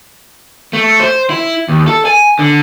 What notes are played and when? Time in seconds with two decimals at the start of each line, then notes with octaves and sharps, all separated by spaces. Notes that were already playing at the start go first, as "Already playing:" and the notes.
0.73 A3
1.00 C5
1.30 E4
1.68 D#2
1.87 A4
2.05 G#5
2.39 D3